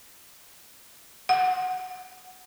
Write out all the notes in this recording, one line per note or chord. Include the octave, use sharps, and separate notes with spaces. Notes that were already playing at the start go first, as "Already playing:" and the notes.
F#5